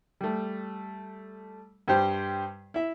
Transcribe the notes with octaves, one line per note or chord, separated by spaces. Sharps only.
G3 A3
G2 G3 G4 C5 G5
E4 E5